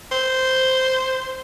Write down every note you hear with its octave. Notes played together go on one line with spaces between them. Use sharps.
C5